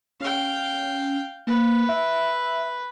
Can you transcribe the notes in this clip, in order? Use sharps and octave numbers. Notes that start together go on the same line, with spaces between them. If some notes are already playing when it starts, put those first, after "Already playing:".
C#4 F5 G5
A#3 B4
E5